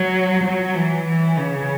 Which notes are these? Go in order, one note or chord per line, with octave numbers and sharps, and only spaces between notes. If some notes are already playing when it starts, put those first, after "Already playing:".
Already playing: F#3
F#3
E3
E3
C#3